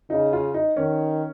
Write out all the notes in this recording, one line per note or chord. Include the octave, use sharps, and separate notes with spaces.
C#3 D#4
F4
D#4
D#3 C#4